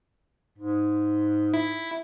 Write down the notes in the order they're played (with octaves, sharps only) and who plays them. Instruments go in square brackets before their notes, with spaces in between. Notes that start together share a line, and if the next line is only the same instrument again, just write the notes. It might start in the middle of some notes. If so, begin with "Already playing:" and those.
[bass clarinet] G#2
[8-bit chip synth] E4